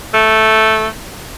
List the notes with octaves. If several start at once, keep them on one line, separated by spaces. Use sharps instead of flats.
A3